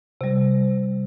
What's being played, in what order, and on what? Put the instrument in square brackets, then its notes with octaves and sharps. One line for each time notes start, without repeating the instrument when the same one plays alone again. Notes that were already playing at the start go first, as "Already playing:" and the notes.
[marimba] C3 G3